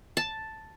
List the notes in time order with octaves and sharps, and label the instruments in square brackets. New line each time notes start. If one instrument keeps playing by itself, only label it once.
[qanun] A5